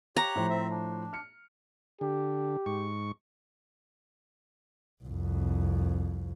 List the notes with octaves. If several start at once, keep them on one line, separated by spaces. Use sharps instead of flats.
G4 C#5 A#5 F#6
A2 F3 C5
C4 E5
D4
F6 C#7
D3 G4
G#2 C#6
C2 F2